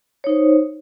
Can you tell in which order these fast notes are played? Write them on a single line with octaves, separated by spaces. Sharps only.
C#5 D#4 C5